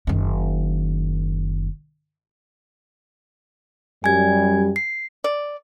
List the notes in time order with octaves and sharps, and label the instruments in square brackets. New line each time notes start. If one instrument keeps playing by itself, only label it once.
[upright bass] F#1 D#3
[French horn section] F#2 G3 [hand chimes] G#5 G#6
[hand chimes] C7
[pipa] D5